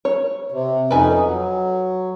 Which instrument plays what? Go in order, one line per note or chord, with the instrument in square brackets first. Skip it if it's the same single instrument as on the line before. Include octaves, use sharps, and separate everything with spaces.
[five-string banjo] C#5
[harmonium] C3
[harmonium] F2 C#4 D#4 [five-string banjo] B4 G#5
[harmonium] F#3